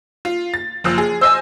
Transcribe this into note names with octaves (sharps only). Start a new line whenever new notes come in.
F4
A6
F#1 F3 E6
G#4
C5 D#5 G#5 E6